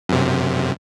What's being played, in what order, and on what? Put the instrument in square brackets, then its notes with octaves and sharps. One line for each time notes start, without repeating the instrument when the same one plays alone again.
[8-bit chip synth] F#2 C3